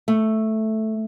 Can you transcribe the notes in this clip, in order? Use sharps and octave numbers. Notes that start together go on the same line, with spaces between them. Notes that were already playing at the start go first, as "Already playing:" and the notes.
A3